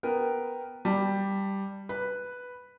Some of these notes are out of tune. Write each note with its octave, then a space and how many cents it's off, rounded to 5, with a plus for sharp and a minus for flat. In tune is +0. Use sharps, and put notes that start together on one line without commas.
B3 +0 A#4 +0 G5 +0
G3 +0 A5 +25
B4 +0 B5 +0